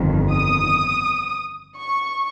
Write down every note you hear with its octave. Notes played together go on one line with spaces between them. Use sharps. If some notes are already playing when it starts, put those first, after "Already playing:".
Already playing: G1 F2 D#3
D#6
C#6